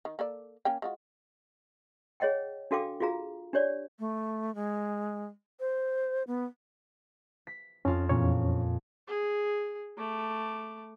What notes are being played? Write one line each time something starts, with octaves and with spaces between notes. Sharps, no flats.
D#3
A#3 A4 D5
A#3 C#4 G5
G#3 F4 F#4
G#4 C#5 D#5 F#5 G5
D4 F#4 A4 F5 G5 D6
F4 F#4 G#4 F5 A#5
D4 G4 C#5 D5
A3
G#3
C5
B3
B6
F2 C#4 F4
E2 A#2 C#4 C#5
G#4
A3 D6